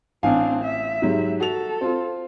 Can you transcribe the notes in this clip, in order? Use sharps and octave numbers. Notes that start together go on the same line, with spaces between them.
A1 C4 D4 F5 G#5
E5
G#2 F#3 G3
F#4 A4 F7
C4 F4